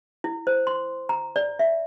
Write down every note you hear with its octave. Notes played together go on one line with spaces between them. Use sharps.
E4
C5
C6
A#5
D5
E5